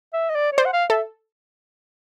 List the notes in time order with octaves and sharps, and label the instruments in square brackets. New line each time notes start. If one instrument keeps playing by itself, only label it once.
[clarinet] E5
D#5
D5
C#5
[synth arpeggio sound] C5 [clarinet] D5
[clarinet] F#5
F5
[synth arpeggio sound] A4 [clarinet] E5